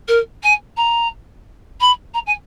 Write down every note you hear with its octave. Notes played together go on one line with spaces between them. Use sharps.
A#4
G#5
A#5
B5
A#5
G#5